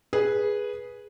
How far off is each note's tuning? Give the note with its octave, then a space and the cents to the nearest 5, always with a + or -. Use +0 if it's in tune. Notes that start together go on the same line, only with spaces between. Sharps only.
G#4 +0 B4 -10